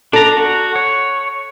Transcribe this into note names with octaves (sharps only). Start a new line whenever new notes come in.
D4 A4 A#5
F#4
C#5